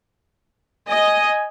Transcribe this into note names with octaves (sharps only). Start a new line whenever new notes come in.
D#5 G#5